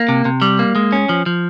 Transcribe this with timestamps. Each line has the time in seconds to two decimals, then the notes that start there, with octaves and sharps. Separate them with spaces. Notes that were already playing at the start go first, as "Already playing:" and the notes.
Already playing: A#3
0.09 C3
0.25 C3
0.42 G3
0.59 A#3
0.75 G#3
0.92 C#4
1.09 F3
1.26 F3